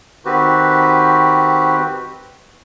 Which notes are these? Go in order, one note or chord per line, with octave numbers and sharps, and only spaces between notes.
D#3 C4 F#4 G4 B4